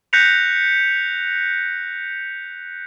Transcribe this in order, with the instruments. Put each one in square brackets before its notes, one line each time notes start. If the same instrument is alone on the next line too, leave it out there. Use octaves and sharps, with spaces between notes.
[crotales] F#6 G6 A#6 B6 C#7 F7